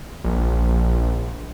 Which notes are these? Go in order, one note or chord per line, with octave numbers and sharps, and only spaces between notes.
A#1